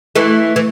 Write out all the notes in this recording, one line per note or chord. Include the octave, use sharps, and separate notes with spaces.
E3 A3
E3